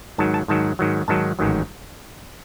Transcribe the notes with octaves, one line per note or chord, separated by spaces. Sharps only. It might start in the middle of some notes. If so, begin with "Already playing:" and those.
G#2 D#3 F#3 A5
A5
G#2 D#3 F#3 A5
G#2 D#3 F#3
G#2 D#3 F#3 A5
A1 G#2 D#3 F#3